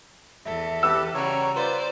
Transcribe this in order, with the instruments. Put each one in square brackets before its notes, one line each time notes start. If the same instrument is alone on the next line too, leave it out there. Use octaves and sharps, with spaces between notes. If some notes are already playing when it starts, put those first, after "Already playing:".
[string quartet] E2 A4 [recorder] E5
[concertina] G4 B4 [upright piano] E6
[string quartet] C#3 G3 F#4 [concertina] C#5 [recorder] A#5
[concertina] F4 [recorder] B4 [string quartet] C5 D5